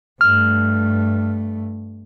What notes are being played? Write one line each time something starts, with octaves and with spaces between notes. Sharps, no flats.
G2 A3 F6